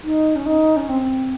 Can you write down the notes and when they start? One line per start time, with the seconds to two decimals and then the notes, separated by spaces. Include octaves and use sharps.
0.04 D#4
0.36 C#4
0.46 D#4
0.77 C#4
0.89 C4